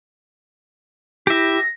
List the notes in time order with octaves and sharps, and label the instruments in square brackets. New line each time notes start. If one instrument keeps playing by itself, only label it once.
[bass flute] E4 [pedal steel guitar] G4 E5 [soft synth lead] A#6